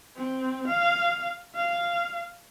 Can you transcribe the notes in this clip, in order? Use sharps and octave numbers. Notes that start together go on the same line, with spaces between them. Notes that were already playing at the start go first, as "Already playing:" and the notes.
C4
F5
F5